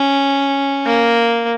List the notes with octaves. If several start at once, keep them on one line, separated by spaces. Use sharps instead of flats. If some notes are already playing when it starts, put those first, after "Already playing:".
Already playing: C#4
A#3